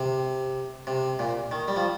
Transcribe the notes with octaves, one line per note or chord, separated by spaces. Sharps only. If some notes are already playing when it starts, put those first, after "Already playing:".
Already playing: C3
C3
A#2
D#3
G3
F3